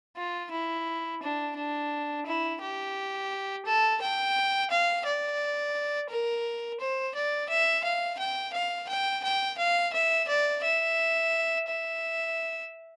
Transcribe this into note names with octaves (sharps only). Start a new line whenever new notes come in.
F4
E4
D4
D4
E4
G4
A4
G5
F5
D5
A#4
C5
D5
E5
F5
G5
F5
G5
G5
F5
E5
D5
E5
E5